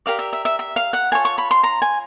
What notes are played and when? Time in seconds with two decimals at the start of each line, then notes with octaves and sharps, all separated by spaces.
0.06 G4 A#4 D5 F5
0.19 E5
0.33 E5
0.45 E5
0.59 E5
0.76 F5
0.93 F#5
1.11 F4 A4 C#5 G#5
1.25 C#6
1.38 B5
1.51 C6
1.63 A#5
1.82 G#5